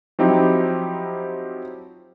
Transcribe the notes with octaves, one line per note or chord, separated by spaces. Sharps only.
F3 F#3 C4 D#4 E4 G4